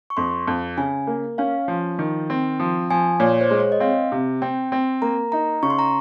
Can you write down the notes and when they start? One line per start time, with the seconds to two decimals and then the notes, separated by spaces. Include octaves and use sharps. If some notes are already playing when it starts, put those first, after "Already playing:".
0.10 C#6
0.17 F2 C6
0.48 F2
0.77 C#3 G#5
1.07 A#3
1.38 C#4 F5
1.68 F3
1.99 D#3
2.30 C4
2.60 F3
2.90 F3 G#5
3.20 A#2 C#5
3.41 C5
3.51 G#3
3.60 C#5
3.72 D#5
3.80 C4 F5
4.12 C3
4.42 C4 G5
4.72 C4
5.02 A#3 A#5
5.32 D#4 A#5
5.63 C#3 C#6
5.70 C6
5.79 A#5